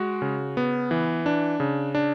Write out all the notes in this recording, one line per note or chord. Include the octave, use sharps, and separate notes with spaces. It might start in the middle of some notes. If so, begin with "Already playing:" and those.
Already playing: G#3 F#4
C#3
B3
E3
D4
C#3
D4